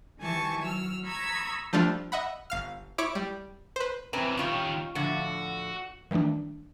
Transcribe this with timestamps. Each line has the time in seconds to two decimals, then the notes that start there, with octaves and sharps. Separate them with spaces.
0.19 D#3 E3 G3 G#5 A5 C#6
0.60 F#3 E6 F6
1.05 A#5 B5 C#6 D#6 E6 G#6
1.73 F3 G3 A3 D4 F4
2.12 D#5 E5 F#5 B5
2.50 G1 F5 F6
2.98 E4 C#5 D6 B6 D7
3.15 G3
3.76 B4 C5
4.13 C3 E3 C4 C#4 B4
4.37 D#3 G3 C#4 F4 C#5
4.95 A2 D3 F3 F#4 F#5
6.11 D#3 E3 G3 A3 D4